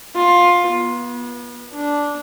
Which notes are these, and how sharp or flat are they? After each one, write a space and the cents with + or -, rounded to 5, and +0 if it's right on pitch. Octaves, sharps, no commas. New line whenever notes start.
F4 +15
B3 -30
D4 -10